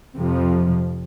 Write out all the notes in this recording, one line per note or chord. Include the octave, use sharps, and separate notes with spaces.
F2 C3 F3